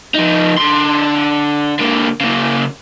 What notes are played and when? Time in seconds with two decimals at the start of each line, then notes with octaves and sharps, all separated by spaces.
0.15 F3 D#4
0.58 D3 C6
1.79 D3 A#3
2.20 C#3 A#3